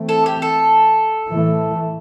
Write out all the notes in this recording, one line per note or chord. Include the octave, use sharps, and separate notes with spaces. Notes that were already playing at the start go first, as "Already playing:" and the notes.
Already playing: E3 A3 C4
A4
G4
A4
A2 E3 A3